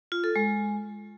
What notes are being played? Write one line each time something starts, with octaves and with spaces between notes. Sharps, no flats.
F4
A4
G#3